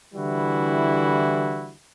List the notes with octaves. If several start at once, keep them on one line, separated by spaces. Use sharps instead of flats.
D3 E3 G3 E4 F#4